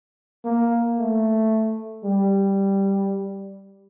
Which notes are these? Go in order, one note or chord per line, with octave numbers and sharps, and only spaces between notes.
A#3
A3
G3